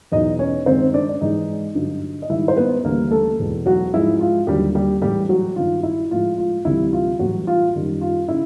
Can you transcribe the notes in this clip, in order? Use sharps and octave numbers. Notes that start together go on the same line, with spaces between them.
E2 B2 F#3 D#4 D#5
C#4 C#5
G2 D#3 G#3 C4 C5
D4 D5
D5
G#2 E3 G#3 D#4 D#5
G2 D3 F#3
D#5
G#2 D#3 G3 E4 E5
C5
B3 B4
D2 C#3 E3 G3 A#3 A#4
A3 A4
E2 B2 G#3
F#3 F#4
G#2 F3 G#3 E4
F4
D#2 D3 F#3 G3 G4
G3 G4
A2 E3 G3 G#3 G4
F#3 F#4
G2 D#3 G3 F4
E4
A2 F3 G#3 F4
F4
D2 C3 E3 G3 E4
F4
A2 E3 F#3 G3 F#4
F4
F#2 D#3 G3
F4
C#3 E4